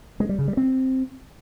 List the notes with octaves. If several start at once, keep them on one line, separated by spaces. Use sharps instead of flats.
G#3
G3
C#3
G3
C4